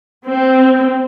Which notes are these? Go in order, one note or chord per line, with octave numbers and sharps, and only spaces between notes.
C4